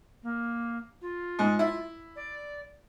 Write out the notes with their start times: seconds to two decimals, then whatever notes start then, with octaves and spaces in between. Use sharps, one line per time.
0.23 A#3
1.02 F4
1.39 G#2
1.59 E4
2.16 D5